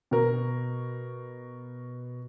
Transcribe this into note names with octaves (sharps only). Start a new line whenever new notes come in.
B2 A#4